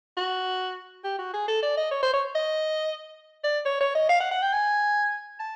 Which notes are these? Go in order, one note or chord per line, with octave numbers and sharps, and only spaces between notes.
F#4
G4
F#4
G#4
A4
D5
D#5
C#5
C5
C#5
D#5
D5
C#5
C#5
D#5
F5
F#5
F#5
G5
G#5
A5